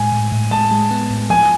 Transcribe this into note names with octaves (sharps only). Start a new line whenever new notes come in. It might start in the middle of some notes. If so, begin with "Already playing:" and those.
Already playing: A2 G#3 G#5
A2
A2
G#3 A5
G#3
B3
A2
F3 G#5